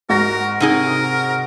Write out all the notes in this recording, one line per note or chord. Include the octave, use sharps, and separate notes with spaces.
G#2 F#4 A#4 A#6
C3 D#4 G#4 A#4